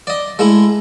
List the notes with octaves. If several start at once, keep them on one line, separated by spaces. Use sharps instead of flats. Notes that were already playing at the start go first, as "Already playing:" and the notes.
D5 D#5
G#3 A3 E4